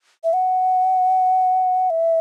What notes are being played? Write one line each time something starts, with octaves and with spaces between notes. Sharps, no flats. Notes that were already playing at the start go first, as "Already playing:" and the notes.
E5
F#5
E5